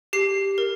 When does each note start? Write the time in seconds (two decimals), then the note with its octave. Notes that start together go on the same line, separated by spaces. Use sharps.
0.13 G4 C7
0.58 A#4